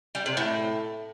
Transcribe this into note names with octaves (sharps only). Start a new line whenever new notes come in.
G3
C3
A2